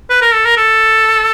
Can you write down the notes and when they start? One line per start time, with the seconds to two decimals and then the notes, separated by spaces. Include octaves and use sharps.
0.10 B4
0.22 A#4
0.34 A4
0.46 A#4
0.57 A4